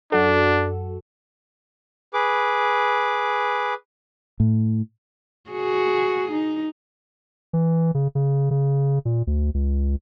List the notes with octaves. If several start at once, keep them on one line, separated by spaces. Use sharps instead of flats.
F#2 D4 F#4 A4
G#4 B4 D6
A2
F#4 G#4
D#4
E3
C#3
C#3
C#3
A#2
D2
C#2